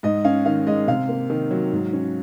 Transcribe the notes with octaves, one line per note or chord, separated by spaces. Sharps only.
G#2 D#5
C#4 F5
D#3 F5
G#3 D#5
C3 F5
A#3
D#3
F#3
G#2
C#4